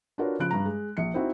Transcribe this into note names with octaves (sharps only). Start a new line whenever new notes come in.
D4 F4 F#4 A#4 B4 C#5
C#3 F3 B5 F#6 D7
G2 A#5
G#3
A#1 C#7
C4 D#4 E4 F#4